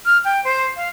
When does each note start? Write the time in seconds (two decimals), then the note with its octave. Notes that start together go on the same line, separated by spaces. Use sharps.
0.06 F6
0.24 G5
0.44 C5
0.76 F5